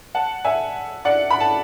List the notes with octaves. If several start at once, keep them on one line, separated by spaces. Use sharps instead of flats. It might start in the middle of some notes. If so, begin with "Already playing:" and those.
F#5 A5
E5 G#5
D5 F#5
B5
A5